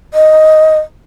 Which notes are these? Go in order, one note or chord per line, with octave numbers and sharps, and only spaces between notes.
D#5